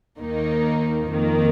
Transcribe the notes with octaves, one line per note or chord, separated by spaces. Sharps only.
D#2 D#3 A#3 D#4
F2 D#3 A#3